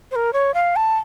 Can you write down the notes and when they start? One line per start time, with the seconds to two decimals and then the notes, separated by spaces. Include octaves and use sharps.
0.11 C5
0.16 A#4
0.33 C#5
0.54 F5
0.76 A5